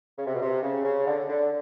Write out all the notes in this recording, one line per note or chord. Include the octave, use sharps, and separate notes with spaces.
C#3
C3
B2
C3
C#3
C#3
D3
D3